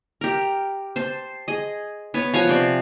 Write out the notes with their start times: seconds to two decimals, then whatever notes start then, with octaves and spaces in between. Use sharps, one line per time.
0.21 G4 A#4
0.96 C5 A5 C6
1.48 G#4 D#5
2.14 B3 B4 C#5
2.34 F3 C#5 F#5 G#5
2.47 C3 C5 D5